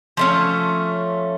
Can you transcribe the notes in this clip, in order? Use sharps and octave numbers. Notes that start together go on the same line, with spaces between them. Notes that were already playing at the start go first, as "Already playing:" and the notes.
F3 A3 C#4